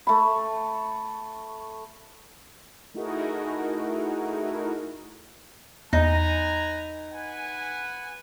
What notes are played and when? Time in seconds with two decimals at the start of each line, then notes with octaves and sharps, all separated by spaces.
0.07 A3 B5
2.94 A3 D#4 E4 F#4 G#4 A#4
5.93 E2 D#4 B4 G#5 A#5
7.12 B4 F#5 G#5